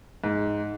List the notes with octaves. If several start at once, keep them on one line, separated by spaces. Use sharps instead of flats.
G#2